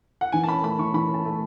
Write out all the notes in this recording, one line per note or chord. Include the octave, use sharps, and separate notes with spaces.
F#5
E3 G#5
A5
C#4 B5
A3 B5
E3 C#6
E3 B5
C#4
A5
A3